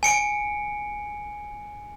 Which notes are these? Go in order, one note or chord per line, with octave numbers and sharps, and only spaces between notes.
G#5 C#7 D7